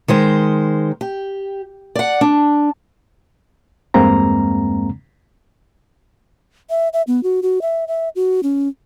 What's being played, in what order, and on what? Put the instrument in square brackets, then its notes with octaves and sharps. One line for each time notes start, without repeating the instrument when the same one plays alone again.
[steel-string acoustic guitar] D#3 G#3 C5
G4
D5 F#5
D4
[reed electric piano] E2 G2 G#3 A#3 C4 A#5
[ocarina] E5
E5
B3
F#4
F#4
E5
E5
F#4
C#4